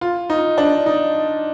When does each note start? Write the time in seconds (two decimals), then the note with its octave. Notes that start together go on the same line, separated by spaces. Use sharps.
0.01 F4
0.30 D#4
0.58 D4
0.86 D#4